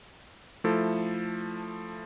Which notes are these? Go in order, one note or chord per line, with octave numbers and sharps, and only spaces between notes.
F3 A3 E4 A4